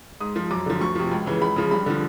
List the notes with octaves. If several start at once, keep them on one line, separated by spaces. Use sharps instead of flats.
G#2 D#6
F3
F#2 D6
D3 F3
D2 C#6
C3 F3
C#2
C#3 E3
C#2 B5
C#3 F3
G2 B5
D3 F3